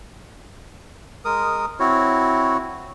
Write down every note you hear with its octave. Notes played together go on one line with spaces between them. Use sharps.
G#3 A#4 D#6
C4 E4 F#4 C#5